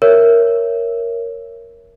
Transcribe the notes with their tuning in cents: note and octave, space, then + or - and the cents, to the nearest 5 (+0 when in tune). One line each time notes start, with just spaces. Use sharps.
A#4 +0 C#5 +0 E5 +10